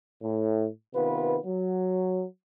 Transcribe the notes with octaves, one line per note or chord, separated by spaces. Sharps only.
A2
C3 D#3 B3 F4 B4
F#3